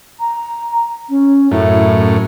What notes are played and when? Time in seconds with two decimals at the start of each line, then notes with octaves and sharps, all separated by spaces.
0.20 A#5
1.10 C#4
1.51 F#2 A2 E4